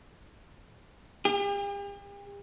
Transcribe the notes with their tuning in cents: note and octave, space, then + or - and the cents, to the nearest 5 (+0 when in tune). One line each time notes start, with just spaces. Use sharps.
G4 +45